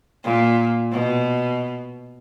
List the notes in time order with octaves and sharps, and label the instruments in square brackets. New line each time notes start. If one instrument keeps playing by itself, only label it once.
[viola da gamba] A#2
B2